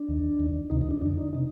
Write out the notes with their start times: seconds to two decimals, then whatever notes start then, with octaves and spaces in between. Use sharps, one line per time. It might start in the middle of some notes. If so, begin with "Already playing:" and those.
Already playing: D4
0.08 D#2 D#3
0.39 D#2 D#3
0.70 D2 C3 D#3 D#4
0.81 D#4
0.91 D4
1.01 F2 D3 D4
1.17 D#4
1.33 C3 D#4